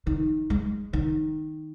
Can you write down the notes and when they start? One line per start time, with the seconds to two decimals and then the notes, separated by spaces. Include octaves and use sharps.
0.07 D#3
0.50 G#3
0.93 D#3